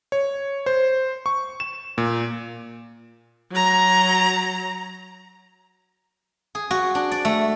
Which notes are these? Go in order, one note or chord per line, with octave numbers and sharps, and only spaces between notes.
C#5
C5
C#6
E7
A#2
F#3 A#5
G#4
F#4
D4
D5
A3